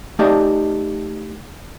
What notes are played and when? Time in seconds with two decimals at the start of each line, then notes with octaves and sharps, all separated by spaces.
0.19 A3 D#4 G4 D5 D#5 A5